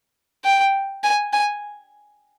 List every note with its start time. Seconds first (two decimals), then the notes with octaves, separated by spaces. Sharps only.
0.45 G5
1.04 G#5
1.33 G#5